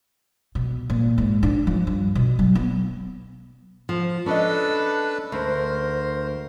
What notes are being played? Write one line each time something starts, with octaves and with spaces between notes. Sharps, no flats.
B2
A#2
G#2
D4
F3
G2
B2
F#3
B3
F3
C#4 D4 A4 B4 D#5
D2 A#4 C5